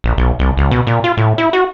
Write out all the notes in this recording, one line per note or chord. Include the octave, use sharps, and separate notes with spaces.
A#1
B1
C2
C#2
B2
A#2
F4
A2
E4
F#4